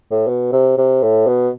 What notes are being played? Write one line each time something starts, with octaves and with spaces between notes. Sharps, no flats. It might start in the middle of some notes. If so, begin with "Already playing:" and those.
A2
B2
C3
C3
A2
B2